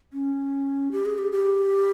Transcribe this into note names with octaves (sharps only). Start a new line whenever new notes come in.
C#4
G4
G#4
G4
G4